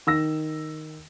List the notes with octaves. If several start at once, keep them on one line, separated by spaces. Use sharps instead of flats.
D#3 E6 A#6